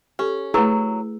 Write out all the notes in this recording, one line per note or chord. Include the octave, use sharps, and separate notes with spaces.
C#4 G4 A4
F#3 A3 E4 G#4 B4 E6